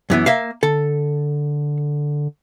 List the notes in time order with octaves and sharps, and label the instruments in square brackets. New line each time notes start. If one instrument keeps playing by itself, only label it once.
[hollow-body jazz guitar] F#2 E3 B3
A#3 E5 F5
[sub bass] D3 [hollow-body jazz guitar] A4